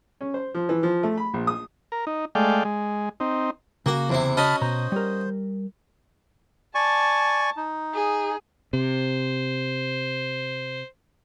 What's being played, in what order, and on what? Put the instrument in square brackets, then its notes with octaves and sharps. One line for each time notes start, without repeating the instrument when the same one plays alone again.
[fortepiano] C#4
C5
F3
E3
F3
A3
B5
A#1
D#6
[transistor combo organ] A#4
D#4
G#3 A3 D5 F5 G5
G#3
C4 D#4
[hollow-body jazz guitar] C#3 [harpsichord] A#3 F#4
[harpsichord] E2 C3 E4
[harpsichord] C#4 F#4 D#5 [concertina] A5 B5 F6
[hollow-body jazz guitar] B2 A#5 [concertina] C5
[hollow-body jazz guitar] G3 A#4
[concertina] D5 G#5 C#6 [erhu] A5
[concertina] D#4
[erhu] G#4
[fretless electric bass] C3 [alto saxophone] C5